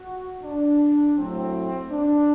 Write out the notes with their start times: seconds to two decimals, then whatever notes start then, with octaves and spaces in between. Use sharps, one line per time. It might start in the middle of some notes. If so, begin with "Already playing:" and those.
Already playing: F#4
0.44 D4
1.17 A2 F#3 C4
1.91 D4